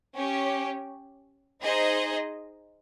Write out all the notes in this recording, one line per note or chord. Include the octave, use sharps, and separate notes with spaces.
C#4 G4 C#5
D#4 G#4 C5 D#5